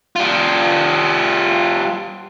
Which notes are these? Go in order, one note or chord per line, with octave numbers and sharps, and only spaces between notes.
G3 F4